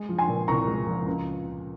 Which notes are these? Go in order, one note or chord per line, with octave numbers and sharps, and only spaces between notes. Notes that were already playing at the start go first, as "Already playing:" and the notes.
Already playing: G#3
F3
G#5 C6
A#2
C2 A#5 C#6
G#3
F3
C#2